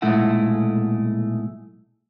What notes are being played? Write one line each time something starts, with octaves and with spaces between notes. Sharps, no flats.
B1 A#2 G#3 A3 E4 F#5